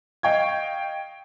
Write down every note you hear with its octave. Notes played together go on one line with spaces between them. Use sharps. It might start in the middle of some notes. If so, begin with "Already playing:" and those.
D#5 F5 G5 C#6 G#6